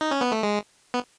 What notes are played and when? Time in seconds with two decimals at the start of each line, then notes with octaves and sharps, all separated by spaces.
0.01 D#4
0.11 C#4
0.21 B3
0.32 A3
0.43 G#3
0.94 B3